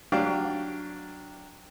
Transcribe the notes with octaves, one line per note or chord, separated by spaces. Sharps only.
F#3 D4 G4 F5